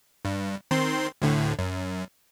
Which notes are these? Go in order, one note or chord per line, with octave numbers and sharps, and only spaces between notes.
G2
D#3 C4 C6
D2 A2 D3
F#2